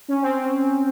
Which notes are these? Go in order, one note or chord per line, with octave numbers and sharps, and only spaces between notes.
C#4
C4